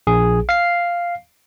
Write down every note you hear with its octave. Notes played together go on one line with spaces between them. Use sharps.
A#1 G#4
F5 C7